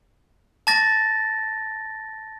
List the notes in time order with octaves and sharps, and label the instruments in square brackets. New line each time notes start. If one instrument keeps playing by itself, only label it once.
[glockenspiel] A5 D6 A6 A#6